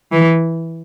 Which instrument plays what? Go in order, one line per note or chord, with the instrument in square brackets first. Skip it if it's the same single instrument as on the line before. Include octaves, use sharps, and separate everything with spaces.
[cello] E3